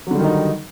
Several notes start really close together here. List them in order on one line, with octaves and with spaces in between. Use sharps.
F#3 D3 G3 D#3 D#4